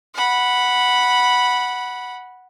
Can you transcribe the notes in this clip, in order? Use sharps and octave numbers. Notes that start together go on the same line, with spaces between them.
F#5 B5